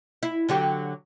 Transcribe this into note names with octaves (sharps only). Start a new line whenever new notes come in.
E4
D3 F#3 G4